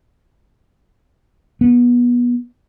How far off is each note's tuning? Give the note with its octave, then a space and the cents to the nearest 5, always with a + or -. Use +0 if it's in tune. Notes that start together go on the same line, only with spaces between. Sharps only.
B3 -25